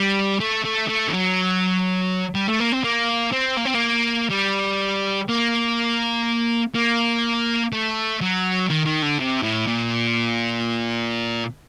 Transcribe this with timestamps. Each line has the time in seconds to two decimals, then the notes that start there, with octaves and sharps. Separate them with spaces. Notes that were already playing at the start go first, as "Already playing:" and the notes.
Already playing: G3
0.40 A3
0.65 A3
0.89 A3
1.08 D#3
1.14 F#3
2.35 G3
2.48 A3
2.60 A#3
2.72 C4
2.84 A#3
3.33 C4
3.57 A#3
3.66 C4
3.75 A#3
4.30 G3
5.29 A#3
6.75 A#3
7.73 A3
8.21 F#3
8.70 D#3
8.86 D#3
9.03 D3
9.19 C3
9.43 A2
9.67 A#2